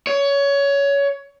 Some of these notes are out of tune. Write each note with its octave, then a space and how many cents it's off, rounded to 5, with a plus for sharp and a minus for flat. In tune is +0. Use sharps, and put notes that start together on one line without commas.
C#5 +20